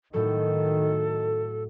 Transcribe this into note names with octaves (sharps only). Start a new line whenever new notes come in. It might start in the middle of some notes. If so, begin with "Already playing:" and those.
A2 D#3 F#3 A4